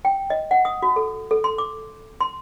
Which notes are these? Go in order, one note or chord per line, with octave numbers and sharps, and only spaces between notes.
G5
D#5
F#5
D#6
F#4
A4
A4
C6
D6
C6